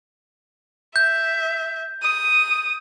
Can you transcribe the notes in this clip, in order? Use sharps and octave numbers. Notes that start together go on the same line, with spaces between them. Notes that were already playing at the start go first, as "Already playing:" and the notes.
E5 G6
D#6